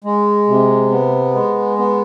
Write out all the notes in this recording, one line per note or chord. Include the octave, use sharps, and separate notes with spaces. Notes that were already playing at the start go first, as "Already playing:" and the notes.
G#3
C3
B3
G#3
B3